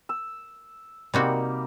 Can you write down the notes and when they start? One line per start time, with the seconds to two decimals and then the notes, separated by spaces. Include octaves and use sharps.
0.09 E6
1.14 C3 G3 A#3 C4 D#4 F#4